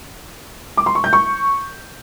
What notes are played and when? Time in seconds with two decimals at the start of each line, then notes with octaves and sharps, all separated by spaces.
0.77 D6
0.86 C6
0.95 C#6
1.04 G6
1.13 C#6